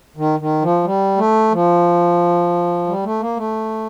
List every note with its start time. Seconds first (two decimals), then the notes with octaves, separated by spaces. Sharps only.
0.17 D#3
0.40 D#3
0.62 F3
0.84 G3
1.17 A3
1.52 F3
2.87 G3
3.04 A3
3.20 A#3
3.37 A3